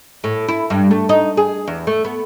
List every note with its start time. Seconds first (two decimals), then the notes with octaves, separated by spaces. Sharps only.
0.24 A2
0.48 E4
0.70 G2
0.91 A3
1.09 D#4
1.37 G#4
1.68 E2
1.87 A3
2.05 B3